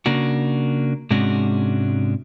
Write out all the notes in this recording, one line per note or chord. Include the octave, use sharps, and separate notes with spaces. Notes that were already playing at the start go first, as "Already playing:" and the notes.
C#3 A#3 D4 F#4
G#2 C3 G#3 C#4 D4 F#4